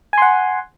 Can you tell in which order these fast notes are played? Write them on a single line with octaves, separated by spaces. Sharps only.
G#5 C6 F#5